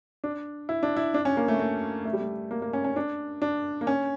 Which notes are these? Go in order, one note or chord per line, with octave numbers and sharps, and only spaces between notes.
D4
E4
D4
E4
D4
C#4
A#3
A3
A3
A3
G3
A3
A#3
A#3
C#4
C#4
D4
D4
A#3
C#4